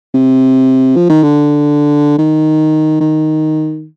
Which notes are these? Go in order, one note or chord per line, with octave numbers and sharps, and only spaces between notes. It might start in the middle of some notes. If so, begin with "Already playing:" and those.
C3
F3
D#3
D3
D#3
D#3